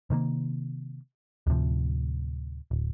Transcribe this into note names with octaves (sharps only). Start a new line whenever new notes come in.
C3 D#3 A3 A#3
D2 A2 C3 F3
D1